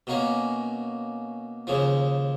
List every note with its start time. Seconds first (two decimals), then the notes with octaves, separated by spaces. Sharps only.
0.07 B2 A#3 C#4
1.67 D#2 C#3 F3